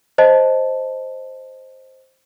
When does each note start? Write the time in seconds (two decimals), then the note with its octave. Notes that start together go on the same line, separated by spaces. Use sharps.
0.18 C5 D#5 A5